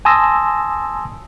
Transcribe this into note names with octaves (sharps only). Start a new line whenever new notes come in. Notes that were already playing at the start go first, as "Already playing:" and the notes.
G#5 A5 C6 D#6 E6 A#6